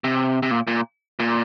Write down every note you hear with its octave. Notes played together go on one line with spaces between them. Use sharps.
C3
C3
A#2
A#2
A#2